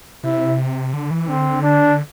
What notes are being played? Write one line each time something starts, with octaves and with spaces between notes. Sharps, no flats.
C3 E4
D3
E3
D3 C4
D4